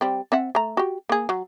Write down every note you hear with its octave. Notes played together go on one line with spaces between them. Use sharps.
G3 C4
C4 E5 F#5
A3 A#5
F#4 G4
A#3 G#4
F#3